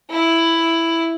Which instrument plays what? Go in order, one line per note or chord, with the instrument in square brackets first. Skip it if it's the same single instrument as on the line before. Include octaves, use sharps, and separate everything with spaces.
[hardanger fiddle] E4